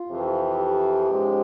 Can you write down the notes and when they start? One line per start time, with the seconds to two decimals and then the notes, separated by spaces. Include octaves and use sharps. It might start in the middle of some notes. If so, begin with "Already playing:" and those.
Already playing: F4
0.08 F2 C3 E3
0.59 G4
1.10 G#2 F3 G#3 C#4